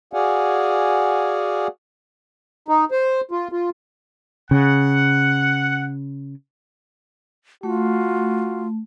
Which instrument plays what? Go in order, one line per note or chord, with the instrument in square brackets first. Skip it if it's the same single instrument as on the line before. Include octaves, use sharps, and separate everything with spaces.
[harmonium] F#4 G#4 D5 F5 F#5 G#5
D#4
C5
F4
F4
[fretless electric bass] C#3 [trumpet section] F#5
[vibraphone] A3 [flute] F4 [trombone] F#4